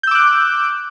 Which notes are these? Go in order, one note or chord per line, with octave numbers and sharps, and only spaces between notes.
D6 E6 F#6 G6